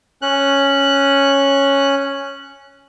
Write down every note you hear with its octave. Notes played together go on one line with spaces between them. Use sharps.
C#4 F#6